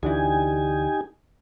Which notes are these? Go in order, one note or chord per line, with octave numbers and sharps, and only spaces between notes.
D2 D3 E3 D#4 G4 G#5